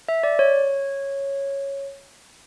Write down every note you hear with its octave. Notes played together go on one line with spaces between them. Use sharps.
E5
D5
C#5